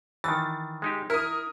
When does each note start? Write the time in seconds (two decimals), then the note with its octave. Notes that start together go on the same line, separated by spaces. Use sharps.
0.24 D#3 E3 A6
0.82 G#3 D#4 G4
1.10 E4 A#4 D#6